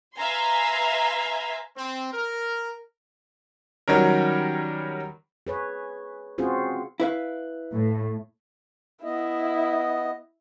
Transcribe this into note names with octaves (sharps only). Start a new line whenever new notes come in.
B4 E5 F5 G#5 A#5 C6
C4
A#4
D#3 F#3 G3 C#4 A#4
G#4 B4 C#5
C4 C#4 F4 F#4 G#4 C5
E4 B4 F5
A2
B3 E4 D#5